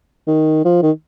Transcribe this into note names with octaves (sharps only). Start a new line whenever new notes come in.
D#3
F3
D#3